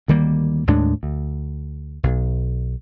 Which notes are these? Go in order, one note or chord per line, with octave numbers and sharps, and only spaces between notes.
D2 D#3 G3 A#3
D#2 A2 G#3 D4
D2
B1